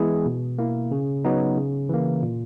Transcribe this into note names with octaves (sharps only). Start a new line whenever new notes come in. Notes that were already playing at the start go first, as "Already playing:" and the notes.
Already playing: E3 G#3 B3 E4 G#4
B2
A#3 E4
C#3
F#3 B3 D#4
C#3
E3 A#3
A#2